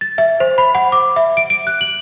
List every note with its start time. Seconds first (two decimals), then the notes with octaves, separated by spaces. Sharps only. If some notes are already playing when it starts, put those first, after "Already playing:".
0.01 A6
0.18 E5
0.40 C5
0.58 B5
0.75 F#5
0.92 D6
1.16 E5
1.37 D7
1.50 D7
1.67 F#6
1.81 F#7